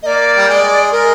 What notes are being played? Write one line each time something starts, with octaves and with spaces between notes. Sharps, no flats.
A#3 D5 D#5
G3
G#3
G#3 A#4